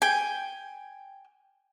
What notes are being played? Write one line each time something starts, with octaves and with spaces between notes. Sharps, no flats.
G5 G#5